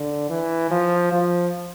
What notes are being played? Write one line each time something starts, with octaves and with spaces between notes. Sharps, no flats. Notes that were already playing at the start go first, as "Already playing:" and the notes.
Already playing: D3
E3
F3
F3